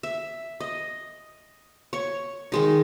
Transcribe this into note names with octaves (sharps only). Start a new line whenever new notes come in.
E5
D#5
C#5 C#6
D#3 G#3 D#4